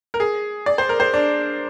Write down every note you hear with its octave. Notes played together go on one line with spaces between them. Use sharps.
A#4
G#4
D5
C5
A#4
C5
D4